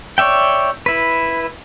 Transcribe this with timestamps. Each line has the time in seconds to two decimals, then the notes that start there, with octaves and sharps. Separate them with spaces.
0.18 C#5 D5 E5 G5
0.86 E4 B4